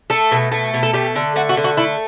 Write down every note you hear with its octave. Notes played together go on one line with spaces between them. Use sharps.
A3 A4
B2
A3
B2
A4
A3 G4
D3
A3 F#4
F#4
D3
F#4
A3 E4